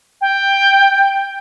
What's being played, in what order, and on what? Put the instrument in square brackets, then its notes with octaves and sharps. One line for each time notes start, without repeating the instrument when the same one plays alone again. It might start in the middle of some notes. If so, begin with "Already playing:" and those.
[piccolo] G5